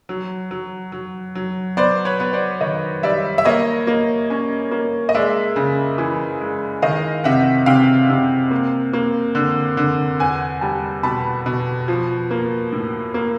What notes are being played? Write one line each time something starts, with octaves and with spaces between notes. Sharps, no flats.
F#3
F#3
F#3
F#3
B3 C5 D5
B4 C#5
B3
C5 D5
D#3 C#5 D#5
G3 D5 E5
E5
A#3 C#5 D#5
A#3
C#4
A#3
D#5
G#3 D5 E5
C#3
E3
G#3
D#3 D#5 F5
C3 E5 F#5
C3 F5 G5
C3
A#3
A#3
D3
D3
E2 F#5 G#5
G3 G5 A5
B2 A5 B5
B2
F3
A#3
A2
A#3